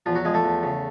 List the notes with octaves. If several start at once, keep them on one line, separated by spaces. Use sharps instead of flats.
E2 F3 F4
F#3 F#4
F3 G#3 G#4
A3 A4
E2
C#3